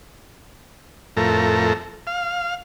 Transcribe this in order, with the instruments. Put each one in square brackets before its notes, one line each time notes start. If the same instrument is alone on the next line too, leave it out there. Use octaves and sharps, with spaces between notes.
[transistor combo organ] F2 A2 A3 A#4
F5